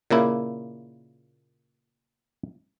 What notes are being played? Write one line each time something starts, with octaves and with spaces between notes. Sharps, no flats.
A#2 C#3 A#3 E4